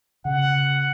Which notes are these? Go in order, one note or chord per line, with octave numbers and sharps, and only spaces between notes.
C#3 F#5